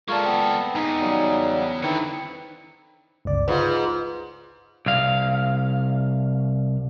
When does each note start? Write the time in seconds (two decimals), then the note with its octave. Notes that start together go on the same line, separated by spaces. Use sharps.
0.08 G#3 F4 A4 A#4 D5 C#6
0.24 B3 C4
0.75 E2 D#4 G#5
1.00 C#3 F#3 G3
1.83 D3 D#3 C4 D#4 E4 B4 C#7
3.25 G1 C#2 D5
3.48 G#2 F4 B4
4.86 C2 F5